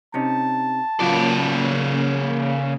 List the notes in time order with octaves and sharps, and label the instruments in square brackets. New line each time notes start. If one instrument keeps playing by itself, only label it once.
[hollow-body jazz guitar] C3 C#4 D#4 [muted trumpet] A5
[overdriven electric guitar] C#3 D5 [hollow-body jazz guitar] F#3 B3 F4 [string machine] A#3 C#4